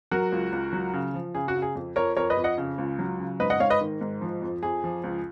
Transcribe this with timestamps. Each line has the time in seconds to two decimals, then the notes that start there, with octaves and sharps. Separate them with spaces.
0.11 F#3 F#4 A#4
0.32 C#2
0.52 C#2
0.73 F#3
0.93 C#3
1.14 F3
1.35 C#3 G#4
1.48 F#4
1.55 C#3
1.62 G#4
1.76 F2
1.96 F2 A#4 C#5
2.17 F2 A#4 C#5
2.30 B4 D#5
2.37 F2
2.44 D#5 F#5
2.58 C#3
2.78 C#2
2.99 F#3
3.19 C#3
3.40 G#2 B4 D#5
3.50 D#5 F#5
3.60 G#2 C#5 F5
3.70 B4 D#5
3.81 D#3
4.01 G#2
4.21 F3
4.42 F2
4.63 F2 G#4
4.84 F3
5.04 C#2